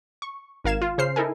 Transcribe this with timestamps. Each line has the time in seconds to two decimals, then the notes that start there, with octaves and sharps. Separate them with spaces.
0.22 C#6
0.64 G#1 A#4 F5 G#6 E7
0.82 F4
0.98 C#3 C5 F6 C7
1.16 D#4 E4 A4 A#4 G#5